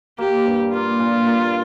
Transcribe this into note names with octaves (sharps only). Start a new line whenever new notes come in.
A#3 G4
G2
A#3 F4
A#2
A#3